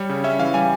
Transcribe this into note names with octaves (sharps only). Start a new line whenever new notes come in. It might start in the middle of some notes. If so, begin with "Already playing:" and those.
Already playing: G3 C#5
C#3
C#4 E5
E3 F5
G3 G#5